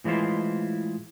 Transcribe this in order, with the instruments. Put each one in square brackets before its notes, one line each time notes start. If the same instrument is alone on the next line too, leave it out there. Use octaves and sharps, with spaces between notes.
[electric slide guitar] A2 E3 G#3 E4 F4 C5